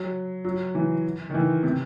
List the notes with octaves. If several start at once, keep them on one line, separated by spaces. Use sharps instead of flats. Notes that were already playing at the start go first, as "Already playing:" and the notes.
Already playing: F#3
F#3
E3
D#3
E3
C3